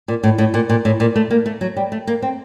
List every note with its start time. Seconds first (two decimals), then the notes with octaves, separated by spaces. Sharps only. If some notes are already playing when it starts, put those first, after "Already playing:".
0.08 A#2
0.23 A2
0.38 A2
0.54 A#2
0.69 A#2
0.85 A2
1.00 A#2
1.16 A3
1.30 A#3
1.46 A3
1.61 F#3
1.76 G3
1.92 A3
2.07 A#3
2.22 C4